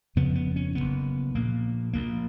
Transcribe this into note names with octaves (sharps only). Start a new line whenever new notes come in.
F#1 F2 C#3 B3
B3
C#4
F#1 F2 C#3 B3
A#1 A#2 A#3
A#1 A#2 A#3